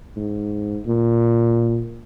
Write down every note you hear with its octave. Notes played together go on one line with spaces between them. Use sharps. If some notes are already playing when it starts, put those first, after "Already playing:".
G#2
A#2